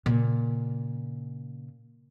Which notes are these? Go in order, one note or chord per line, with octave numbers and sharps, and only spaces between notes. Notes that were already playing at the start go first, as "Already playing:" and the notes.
A#2 C#3